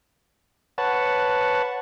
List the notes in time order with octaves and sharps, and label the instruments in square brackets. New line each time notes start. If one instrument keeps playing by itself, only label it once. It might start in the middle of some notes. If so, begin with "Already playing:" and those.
[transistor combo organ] B4 C#5 F#5 A5